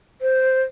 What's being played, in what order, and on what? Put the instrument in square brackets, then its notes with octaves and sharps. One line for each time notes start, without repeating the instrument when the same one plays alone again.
[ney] C5